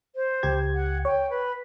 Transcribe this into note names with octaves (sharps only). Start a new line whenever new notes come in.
C5
C#2 G4 G#6
F#5
C#5 G5
B4